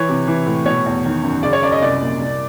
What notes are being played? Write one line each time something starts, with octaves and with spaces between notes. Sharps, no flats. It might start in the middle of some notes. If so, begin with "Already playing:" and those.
Already playing: E3 C#5
C3
E3
A2
B2 C#5
E2
D#3
F#2
C#3 D5
C#5
F#2 D5
D#5
C2 D5
A#2
C2